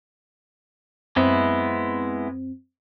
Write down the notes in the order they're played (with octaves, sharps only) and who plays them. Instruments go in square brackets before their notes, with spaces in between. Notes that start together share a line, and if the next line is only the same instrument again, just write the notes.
[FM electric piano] F#2 C4 [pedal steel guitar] G#3 B3 E4